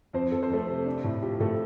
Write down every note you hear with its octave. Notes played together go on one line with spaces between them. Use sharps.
F2 C4 C5
F2 A4
C5
F2 A3 A4
C3
D4
A2
F4 G4
A2 A3 A4